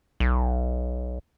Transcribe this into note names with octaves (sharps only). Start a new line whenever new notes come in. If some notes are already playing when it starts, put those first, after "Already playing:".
B1